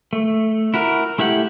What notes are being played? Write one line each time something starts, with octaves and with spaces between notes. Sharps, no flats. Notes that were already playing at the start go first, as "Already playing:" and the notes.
A3
E4 F#4 A#4
A3 E4 G4 F#5